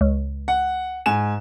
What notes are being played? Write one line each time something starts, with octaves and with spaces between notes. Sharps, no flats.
C#2
F#5
G#2 G#5 E7